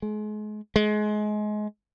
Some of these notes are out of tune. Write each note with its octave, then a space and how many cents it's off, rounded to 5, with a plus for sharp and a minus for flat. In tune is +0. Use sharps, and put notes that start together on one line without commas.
G#3 +35
G#3 +25